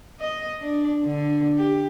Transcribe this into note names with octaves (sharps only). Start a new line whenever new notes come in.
D#5
D4
D3
G4